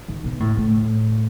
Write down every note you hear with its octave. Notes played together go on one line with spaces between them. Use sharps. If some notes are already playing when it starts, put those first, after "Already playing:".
D#3
B2
A2
A2